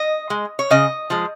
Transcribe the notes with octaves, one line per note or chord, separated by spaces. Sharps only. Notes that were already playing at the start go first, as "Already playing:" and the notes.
Already playing: D#5
G#3
C#5
C#3 D#5
F3 G#3